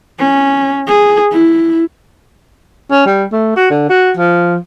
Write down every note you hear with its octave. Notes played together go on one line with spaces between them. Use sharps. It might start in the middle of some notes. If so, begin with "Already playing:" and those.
C#4
G#4
E4
C#4
G3
A3
F#4
D3
F#4
F3